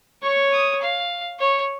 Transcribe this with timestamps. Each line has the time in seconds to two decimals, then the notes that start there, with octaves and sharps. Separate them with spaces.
0.23 C#5 C#6
0.53 D#6
0.82 F5
1.40 C#5